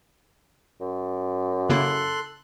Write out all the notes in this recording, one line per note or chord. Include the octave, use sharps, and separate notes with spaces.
F#2
C#3 A#3 E4 A4 C6 F#6